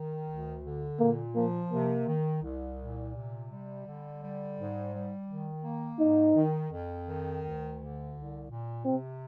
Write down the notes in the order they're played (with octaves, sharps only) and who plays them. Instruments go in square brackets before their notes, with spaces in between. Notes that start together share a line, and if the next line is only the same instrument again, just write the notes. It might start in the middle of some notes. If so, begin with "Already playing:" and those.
Already playing: [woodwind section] D#3
D2
D3
[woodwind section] A#2 [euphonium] A#3
[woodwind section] F3 [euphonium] A#3
[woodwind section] C3 [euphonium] A#3
[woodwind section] D#3
C2
A#2
C3
G3
D3
G3
G#2
G3
D#3
A#3
[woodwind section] G#2 [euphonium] D#4
[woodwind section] D#3
F2
D#3
D2
D3
C2
A#2
[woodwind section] C3 [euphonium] C4